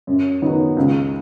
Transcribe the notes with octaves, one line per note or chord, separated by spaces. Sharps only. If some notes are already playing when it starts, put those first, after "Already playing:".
F#2
D#3 F#3 B3 D#4
C#2